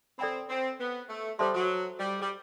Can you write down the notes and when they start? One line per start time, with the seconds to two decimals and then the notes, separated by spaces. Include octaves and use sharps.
0.19 C4 A4 D5 G5 B5
0.49 C4
0.79 B3
1.09 A3
1.39 G3 A4 C5 E5 A5 C6
1.54 F#3
1.99 G3
2.21 G3